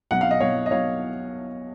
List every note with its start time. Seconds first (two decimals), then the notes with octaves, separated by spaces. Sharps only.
0.11 B1 F#5
0.21 F5
0.31 D#5
0.40 B1 C#5 F5
0.66 D#5
0.71 B1 C#5 F5